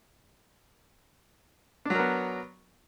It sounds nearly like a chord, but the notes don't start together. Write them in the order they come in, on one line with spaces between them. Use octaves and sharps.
D4 F#3 A#4 B3